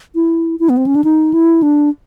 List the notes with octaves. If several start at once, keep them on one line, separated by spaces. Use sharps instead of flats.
E4
E4
B3
C4
C#4
D4
D#4
E4
D4